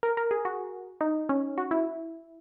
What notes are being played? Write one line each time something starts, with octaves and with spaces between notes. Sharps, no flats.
A#4
A#4
G#4
F#4
D#4
C#4
F#4
E4